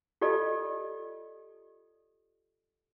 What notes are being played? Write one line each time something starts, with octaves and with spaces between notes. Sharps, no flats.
F4 G4 A4 D5 D#5